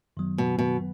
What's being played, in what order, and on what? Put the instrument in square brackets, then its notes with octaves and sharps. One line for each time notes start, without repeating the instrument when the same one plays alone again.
[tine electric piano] F#2 D#3 F#3 B3
[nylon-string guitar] B2
B2